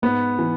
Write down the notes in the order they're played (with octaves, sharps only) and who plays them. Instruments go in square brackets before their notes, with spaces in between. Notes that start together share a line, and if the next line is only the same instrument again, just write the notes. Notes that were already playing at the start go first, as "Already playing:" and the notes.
[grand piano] G#2 B3
E3